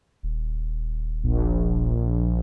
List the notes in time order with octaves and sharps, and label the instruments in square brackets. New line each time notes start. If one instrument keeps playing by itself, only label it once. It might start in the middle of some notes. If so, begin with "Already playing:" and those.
[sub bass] D#1
[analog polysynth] A#1